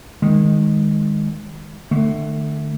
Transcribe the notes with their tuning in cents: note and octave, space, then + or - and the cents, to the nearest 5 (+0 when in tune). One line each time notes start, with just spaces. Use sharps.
D#3 +0 G#3 -15
D3 +40 A3 +0